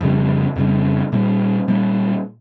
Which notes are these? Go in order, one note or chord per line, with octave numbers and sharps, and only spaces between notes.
F2 C#3 G3
F2 C#3 G3
A#2 G3 A#3
A#2 G3 A#3